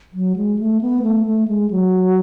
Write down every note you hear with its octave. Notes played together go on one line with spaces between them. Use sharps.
F#3
G#3
A3
B3
A3
A3
G#3
F#3